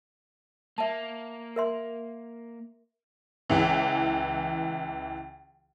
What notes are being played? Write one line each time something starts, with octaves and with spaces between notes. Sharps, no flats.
A#3 E5 A5
A#4 E5 C6
C#2 E3